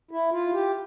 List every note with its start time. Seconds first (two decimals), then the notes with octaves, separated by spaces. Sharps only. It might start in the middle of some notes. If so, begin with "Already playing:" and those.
0.11 E4
0.32 F4
0.53 G4